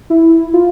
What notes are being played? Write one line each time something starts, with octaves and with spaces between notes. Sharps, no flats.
E4
F4